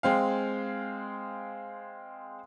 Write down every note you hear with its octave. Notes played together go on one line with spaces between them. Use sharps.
G#3 C4 F5